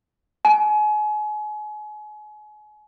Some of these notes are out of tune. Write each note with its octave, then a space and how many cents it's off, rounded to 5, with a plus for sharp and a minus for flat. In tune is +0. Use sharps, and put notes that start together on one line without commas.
G#5 +35